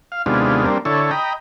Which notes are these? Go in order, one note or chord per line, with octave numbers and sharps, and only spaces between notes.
F5
D#2 C3 G#3 B3 D4 F4
G3 A#3 C4 D4
D3 E4 A4 C#5
D#5 G5 A#5 B5